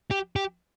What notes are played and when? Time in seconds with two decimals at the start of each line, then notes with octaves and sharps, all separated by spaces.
0.11 G4
0.36 G4